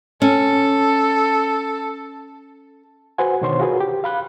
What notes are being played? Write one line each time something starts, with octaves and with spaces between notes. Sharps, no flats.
C#4 A4
F#4 B4 C5 F#5 G#5
B2 D3 D#3 C5 C#5 C6
F4 F#4 G#4 A#4 B4
G4
F5 B5 F#6